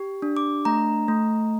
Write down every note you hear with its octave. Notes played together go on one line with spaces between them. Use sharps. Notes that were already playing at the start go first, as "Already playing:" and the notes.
Already playing: G4
D4
D6
A3 A#5
A3